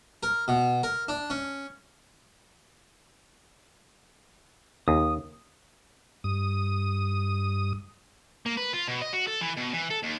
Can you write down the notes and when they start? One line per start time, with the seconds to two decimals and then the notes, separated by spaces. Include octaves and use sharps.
0.23 A#4
0.48 B2
0.83 A#4
1.08 D4
1.30 C#4
4.88 D#2 D#6
6.24 G2 D#6
8.46 A#3
8.57 B4
8.73 F4
8.88 B2
9.01 D#5
9.13 F#4
9.27 A4
9.41 E3
9.57 B2
9.73 E3
9.90 A4
10.03 D#2